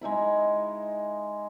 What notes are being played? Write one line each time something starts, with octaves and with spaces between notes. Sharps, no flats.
G#3 D#4 E4 B5